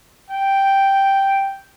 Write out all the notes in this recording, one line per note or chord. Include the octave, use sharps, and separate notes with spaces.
G5